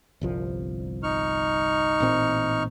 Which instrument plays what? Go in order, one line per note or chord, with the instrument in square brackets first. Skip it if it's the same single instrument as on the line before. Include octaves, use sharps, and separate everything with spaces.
[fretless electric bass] G1 C2 F3
[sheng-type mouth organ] D#4 C#6 F6
[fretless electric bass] A1 A#2 C4